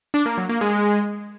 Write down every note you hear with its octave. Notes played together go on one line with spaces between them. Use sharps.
D4
A#3
F#3
A#3
G#3